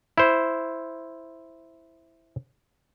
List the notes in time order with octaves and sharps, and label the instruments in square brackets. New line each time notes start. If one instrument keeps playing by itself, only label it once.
[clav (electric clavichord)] E4 C5